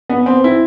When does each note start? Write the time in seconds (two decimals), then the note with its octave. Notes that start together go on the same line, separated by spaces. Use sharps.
0.10 B3
0.26 C4
0.44 E4